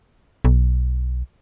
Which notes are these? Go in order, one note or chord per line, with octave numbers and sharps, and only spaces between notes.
B1